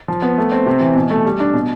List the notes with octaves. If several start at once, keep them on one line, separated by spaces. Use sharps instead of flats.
F3
B3
A3
C4
C3
E3
B2
A3
G3
D4
B2